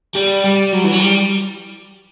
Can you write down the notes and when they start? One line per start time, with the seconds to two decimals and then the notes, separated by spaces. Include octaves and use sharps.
0.15 G3
0.44 G3
0.72 F#3
0.84 E3
0.92 F#3
1.00 G3